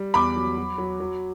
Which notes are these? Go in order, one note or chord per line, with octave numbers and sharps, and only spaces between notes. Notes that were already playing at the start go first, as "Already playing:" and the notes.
Already playing: G3
E2 B5 D6
F#3
F#3
F#3
F#3